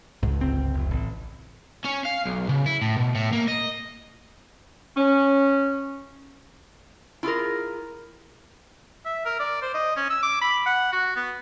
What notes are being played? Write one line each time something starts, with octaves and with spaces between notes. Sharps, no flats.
C#2 G#2
G1 C4
F1
A1
C#4
F5
B1
C#3
E4
A2
B2
A2
A#3
D#5
C#4
E4 F4 G#4 A#4
E5
A#4
D5
C5
D#5
C#4
E6
D6
B5
F#5
F#4
B3